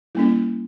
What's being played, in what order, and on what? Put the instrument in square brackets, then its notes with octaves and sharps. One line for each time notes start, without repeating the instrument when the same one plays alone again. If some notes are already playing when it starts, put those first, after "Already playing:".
[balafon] G3 A#3 C#4 E4